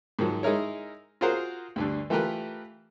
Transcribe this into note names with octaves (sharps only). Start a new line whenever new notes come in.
G#2 D#3 F3 F#3
G#3 D#4 E4 A#4 C#5
F4 F#4 G#4 A#4 C5 F#5
D2 G2 D3
E3 A3 F4 G4 A#4 B4